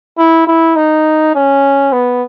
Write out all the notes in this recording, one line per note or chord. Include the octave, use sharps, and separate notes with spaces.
E4
E4
D#4
C#4
B3